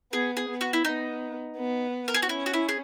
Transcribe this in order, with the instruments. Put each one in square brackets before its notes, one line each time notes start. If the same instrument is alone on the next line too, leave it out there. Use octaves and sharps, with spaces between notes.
[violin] B3 [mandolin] G#4
[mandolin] G#4
[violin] B3
[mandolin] F#4
E4
[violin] B3 [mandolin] D#4
[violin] B3
[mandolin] A#4
G#4
F#4
[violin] C#4 [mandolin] E4
[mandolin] F#4
E4
G#4